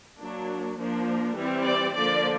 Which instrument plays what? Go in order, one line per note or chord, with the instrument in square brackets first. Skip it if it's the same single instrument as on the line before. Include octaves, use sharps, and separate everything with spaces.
[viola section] F#3 A#3 D4
F3 A#3 D4
E3 G3 C4
D5
D3 F3 A#3 D5